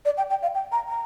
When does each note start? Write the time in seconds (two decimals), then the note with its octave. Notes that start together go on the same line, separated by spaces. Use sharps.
0.05 D5
0.17 G5
0.30 G5
0.42 F5
0.55 G5
0.72 A#5
0.89 A#5